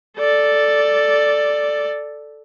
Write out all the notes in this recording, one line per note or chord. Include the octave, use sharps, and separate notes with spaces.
A4 D5